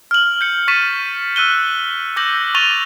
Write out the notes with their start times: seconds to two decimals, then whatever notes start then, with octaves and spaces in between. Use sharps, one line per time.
0.11 F6 F#7
0.41 G6 C#7
0.68 C#6 A6 B6 D#7 E7
1.36 E6 F#6 D#7 G7
2.16 D6 E6 G6 A#6 F#7
2.55 C#6 D6 A6 D#7 F7 G7